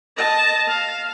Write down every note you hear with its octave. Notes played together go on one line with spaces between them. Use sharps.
D#5 A5
F5